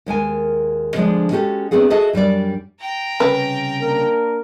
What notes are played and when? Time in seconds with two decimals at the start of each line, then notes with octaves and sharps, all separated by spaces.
0.06 D#2 G#3 A#4 G#5
0.94 D3 F3 G#3 D4
1.31 G#3 C#4 F#4 G4 A4
1.71 A3 B3 C4 D4 G#4 F#5
1.90 F#4 G#4 A4 D#5 E5 A5
2.13 F#2 G3 D4 D5
2.80 G5 A#5
3.20 C2 C#3 C#4 B4
3.80 A#3 D4 A#4